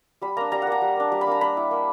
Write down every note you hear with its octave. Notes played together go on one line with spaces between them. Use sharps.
G3 B5
A#3 D4 A#5
G3 A#5
F#5
A#3 D4 A#5
G3
A#3 D4
G3 A#5
B5
A#3 D4 A#5
A#3 B5
E4
A#3